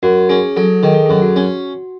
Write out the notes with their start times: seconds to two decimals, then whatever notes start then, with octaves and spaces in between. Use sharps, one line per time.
0.03 F#2 F#4
0.29 C#4 G#4
0.56 F#3 A4
0.83 D#3 G#4
0.94 A4
1.06 F#2 G#4
1.22 F#4
1.36 C#4